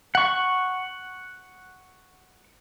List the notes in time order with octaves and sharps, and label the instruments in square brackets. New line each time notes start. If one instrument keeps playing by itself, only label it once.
[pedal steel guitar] F#5 C#6